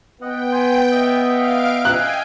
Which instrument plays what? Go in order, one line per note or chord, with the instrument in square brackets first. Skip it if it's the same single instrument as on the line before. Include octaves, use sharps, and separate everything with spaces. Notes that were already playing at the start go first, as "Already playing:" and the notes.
[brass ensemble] B3 [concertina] D#5 F#5 [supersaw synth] G5
[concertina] G#5 C6
D#5 E5 D#6
[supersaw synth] F5 D7
[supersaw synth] G5 G#5 [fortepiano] F#6